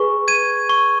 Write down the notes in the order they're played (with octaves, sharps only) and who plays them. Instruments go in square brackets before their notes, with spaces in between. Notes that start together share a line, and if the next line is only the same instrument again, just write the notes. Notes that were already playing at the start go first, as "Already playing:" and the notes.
Already playing: [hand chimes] G#4 B4 [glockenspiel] C#6
[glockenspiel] G#6 D#7
C#6